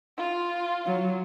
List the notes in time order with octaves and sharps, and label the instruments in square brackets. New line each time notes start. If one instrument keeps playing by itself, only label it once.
[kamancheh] F4
[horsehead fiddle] F#3